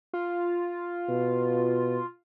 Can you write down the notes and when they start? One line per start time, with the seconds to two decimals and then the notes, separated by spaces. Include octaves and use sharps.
0.13 F4
1.09 B2